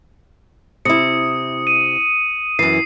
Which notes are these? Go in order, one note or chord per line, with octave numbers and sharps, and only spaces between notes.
C3 E4 D#6 C#7
D#7
F#2 E3 C7